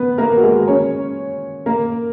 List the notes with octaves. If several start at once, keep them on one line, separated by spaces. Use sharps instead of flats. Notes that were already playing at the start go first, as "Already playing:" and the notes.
Already playing: B3 B4
A#3 A#4
F#4
G#3 G#4
C#4 C#5
A#3 A#4